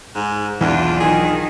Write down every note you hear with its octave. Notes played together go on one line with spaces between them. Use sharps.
G#2
B1 E2 E3 D4 F4
D#3 G#4